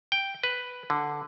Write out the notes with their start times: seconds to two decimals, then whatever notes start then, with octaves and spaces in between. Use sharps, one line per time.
0.12 G5
0.43 B4
0.90 D3